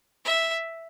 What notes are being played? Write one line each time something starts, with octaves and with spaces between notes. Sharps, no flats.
E5